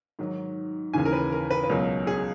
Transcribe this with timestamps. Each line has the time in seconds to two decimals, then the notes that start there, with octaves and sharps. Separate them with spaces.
0.19 G#2 D#3 F#3
0.94 D#2 C#3 E3 G#5
1.05 A#4
1.13 B4
1.32 A#4
1.51 B4
1.64 B4
1.69 C#2 B2 F#3 A#4
2.07 G#4